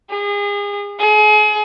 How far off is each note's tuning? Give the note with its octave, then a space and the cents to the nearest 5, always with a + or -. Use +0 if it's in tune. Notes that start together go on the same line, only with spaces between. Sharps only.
G#4 -35
G#4 +35